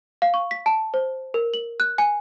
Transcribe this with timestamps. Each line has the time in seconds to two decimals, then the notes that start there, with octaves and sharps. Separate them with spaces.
0.22 F5
0.34 C#6
0.51 B6
0.66 A5
0.94 C5
1.34 A#4
1.54 F#7
1.80 F#6
1.98 G#5